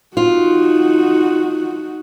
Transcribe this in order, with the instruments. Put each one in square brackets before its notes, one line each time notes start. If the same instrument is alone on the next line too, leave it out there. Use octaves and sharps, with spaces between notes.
[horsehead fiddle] D#4 F#4 [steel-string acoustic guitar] F4